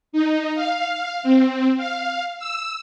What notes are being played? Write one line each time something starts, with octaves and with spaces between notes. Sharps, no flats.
D#4
F5
C4
F5
E6